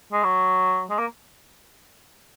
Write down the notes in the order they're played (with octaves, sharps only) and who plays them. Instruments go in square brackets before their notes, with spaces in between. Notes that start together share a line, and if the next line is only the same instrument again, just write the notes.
[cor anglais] G#3
F#3
G#3
A#3